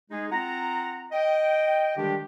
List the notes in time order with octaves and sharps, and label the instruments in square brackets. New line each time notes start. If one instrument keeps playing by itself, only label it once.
[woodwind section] G#3 D#4 G#4
C4 F4 F#5 A#5
D#5 G5
D3 D#3 G3 G#3 D4 G4